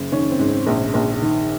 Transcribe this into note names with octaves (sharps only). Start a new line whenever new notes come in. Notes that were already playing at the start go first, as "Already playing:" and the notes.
Already playing: F#1
D#3 C#4
C4
G#2
C4
A#1
A#1
D#3